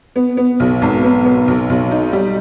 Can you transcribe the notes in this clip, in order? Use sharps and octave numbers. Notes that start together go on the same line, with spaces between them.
B3
B3
B1
G#1
B3
B3
B1
B1
D#4
G3